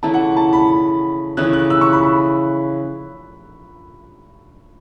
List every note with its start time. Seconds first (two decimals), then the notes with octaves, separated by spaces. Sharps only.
0.03 C#3 E3 A3 E4 A5
0.14 F#5
0.37 A5
0.53 B5
1.37 C#3 E3 A3 F#6
1.53 F#6
1.70 E6
1.81 C#6
1.93 B5
2.03 B5